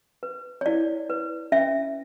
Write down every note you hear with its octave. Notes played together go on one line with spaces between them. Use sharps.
B4
C#5
E4 D5
B4
C#4 E5